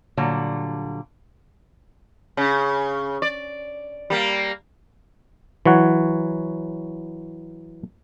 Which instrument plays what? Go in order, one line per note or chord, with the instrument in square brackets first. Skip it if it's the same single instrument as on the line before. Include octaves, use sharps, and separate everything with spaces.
[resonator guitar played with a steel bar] A#2 D3 F#3 G3
[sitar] C#3
D5
G3 A#3
[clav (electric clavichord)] E3 F#3 C#5 F#5